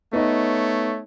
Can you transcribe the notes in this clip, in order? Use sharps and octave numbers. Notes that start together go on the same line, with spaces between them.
A3 B3 D#4 C#5 D#5